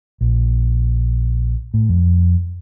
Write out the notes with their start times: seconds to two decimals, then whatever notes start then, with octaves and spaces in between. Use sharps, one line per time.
0.21 A#1
1.74 A2
1.89 F2